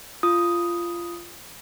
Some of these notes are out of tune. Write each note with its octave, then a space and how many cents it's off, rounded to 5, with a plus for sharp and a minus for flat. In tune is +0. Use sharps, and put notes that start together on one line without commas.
F4 -15 D#6 +0